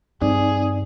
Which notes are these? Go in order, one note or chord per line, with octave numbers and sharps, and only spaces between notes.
G2 C4 D#4 G#4 D5